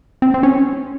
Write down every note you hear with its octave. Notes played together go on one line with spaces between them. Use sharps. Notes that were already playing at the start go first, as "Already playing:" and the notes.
C4
C4
C#4